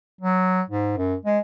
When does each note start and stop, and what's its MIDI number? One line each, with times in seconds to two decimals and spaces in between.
0.21 0.62 54
0.70 0.92 44
0.97 1.15 42
1.25 1.39 56